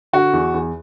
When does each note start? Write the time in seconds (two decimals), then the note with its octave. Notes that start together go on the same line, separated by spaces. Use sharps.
0.13 D3 F#4
0.33 E2
0.54 E2